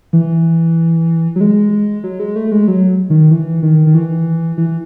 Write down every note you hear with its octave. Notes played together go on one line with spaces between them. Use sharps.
E3
F#3
G#3
F#3
G#3
A3
G#3
F#3
D#3
E3
D#3
D#3
E3
E3